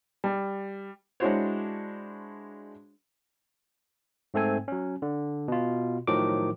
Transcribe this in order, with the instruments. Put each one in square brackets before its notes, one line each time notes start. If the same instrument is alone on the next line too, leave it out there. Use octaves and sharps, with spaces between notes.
[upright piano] G3
[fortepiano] G#3 D4 E4 F#4 C5 C#5
[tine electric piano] G#2 A3 C4 A4 G#5
F#3 C#4
D3
B2 F4
A2 D#3 F3 F#3 D6